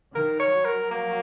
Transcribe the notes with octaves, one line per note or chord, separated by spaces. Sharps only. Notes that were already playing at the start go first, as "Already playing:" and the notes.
D#3 A#4
C#5
F#3
A#4
A#3